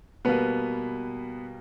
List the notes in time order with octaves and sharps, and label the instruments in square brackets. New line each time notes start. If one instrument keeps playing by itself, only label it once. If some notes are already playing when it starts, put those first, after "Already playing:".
[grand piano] B2 G3 A#3 B3 B4